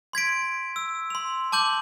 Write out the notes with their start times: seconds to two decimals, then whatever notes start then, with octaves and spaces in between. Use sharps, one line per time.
0.13 C6 G#6 B6 D7
0.76 E6
1.10 C6 F7
1.52 A5 D6 G6 F#7